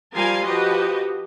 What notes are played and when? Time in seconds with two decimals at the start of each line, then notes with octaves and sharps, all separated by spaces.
0.14 F3 G3 A#4 F5 G#5 C6
0.45 F3 F#4 G4 B4 D#5